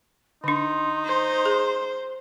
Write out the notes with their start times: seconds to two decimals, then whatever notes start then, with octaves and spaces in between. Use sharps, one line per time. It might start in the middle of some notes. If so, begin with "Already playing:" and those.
0.44 D3 D4 D#4 C6
1.06 C5
1.46 G#4